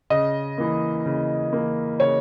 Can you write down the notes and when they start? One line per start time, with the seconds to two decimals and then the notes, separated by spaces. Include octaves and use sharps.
0.10 C#3 D#5
0.58 E3 A#3
1.06 C#3
1.53 E3 A#3
2.00 C#3 C#5